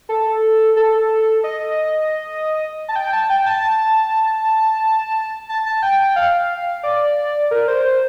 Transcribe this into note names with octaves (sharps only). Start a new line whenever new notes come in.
A4
A4
D#5
A5
G5
A5
G5
A5
A5
A5
G5
F5
D5
A#4
C5
C5